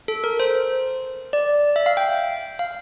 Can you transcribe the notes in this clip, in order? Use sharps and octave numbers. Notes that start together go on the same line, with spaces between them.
A4
A#4
C5
D5
E5
F5
G5
F5